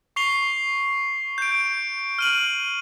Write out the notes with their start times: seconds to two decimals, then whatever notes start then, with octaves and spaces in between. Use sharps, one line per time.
0.16 C#6 C7 F7 G7
1.38 G6 D7
2.19 F6 D#7 F#7